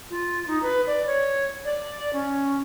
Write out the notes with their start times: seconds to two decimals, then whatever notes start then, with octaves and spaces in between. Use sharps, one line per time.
0.11 F4
0.47 D#4
0.63 B4
0.87 D5
1.07 C#5
1.65 D5
2.13 C#4